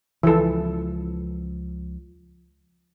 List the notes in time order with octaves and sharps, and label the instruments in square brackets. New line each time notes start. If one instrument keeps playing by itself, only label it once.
[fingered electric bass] C#2 F3 [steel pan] E3 A4